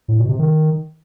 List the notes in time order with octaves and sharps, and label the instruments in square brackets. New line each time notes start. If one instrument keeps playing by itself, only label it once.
[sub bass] A2
B2
C3
D#3